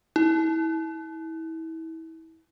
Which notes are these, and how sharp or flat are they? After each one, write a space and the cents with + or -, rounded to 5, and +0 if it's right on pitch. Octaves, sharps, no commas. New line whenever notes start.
E4 -30